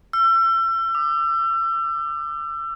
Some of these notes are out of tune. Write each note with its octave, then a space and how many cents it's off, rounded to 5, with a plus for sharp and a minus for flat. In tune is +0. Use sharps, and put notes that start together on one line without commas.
E6 +35
D6 +35